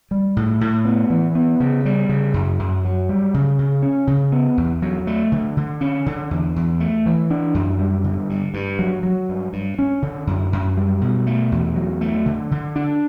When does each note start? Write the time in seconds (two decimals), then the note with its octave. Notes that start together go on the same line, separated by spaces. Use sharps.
0.11 G3
0.37 A2
0.61 A2
0.85 B3
1.10 E3
1.35 B3
1.60 C#3
1.85 G3
2.09 C#3
2.34 F#2
2.59 F#2
2.85 F#3
3.09 G3
3.34 C#3
3.59 C#3
3.83 C#4
4.07 C#3
4.32 B3
4.57 E2
4.82 F#3
5.07 A3
5.32 D3
5.57 D3
5.81 C#4
6.06 D3
6.31 E2
6.56 E2
6.80 A3
7.06 E3
7.30 D4
7.54 F#2
7.79 G3
8.04 D3
8.30 G2
8.54 G2
8.79 F#3
9.03 F#3
9.29 G2
9.53 G2
9.79 C#4
10.02 D3
10.27 F#2
10.53 F#2
10.77 G3
11.01 B2
11.27 A3
11.52 E2
11.76 F#3
12.01 A3
12.26 D3
12.51 D3
12.76 D4